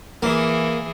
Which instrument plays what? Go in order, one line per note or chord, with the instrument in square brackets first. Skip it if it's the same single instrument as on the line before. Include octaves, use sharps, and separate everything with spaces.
[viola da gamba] E3 G#4 [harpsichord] A#3